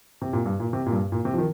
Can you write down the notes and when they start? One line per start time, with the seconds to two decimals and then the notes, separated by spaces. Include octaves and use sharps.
0.22 C3
0.33 A#2
0.46 G2
0.60 A#2
0.73 C3
0.86 A#2
0.92 G2
1.12 A#2
1.25 C3
1.34 F3
1.38 D#3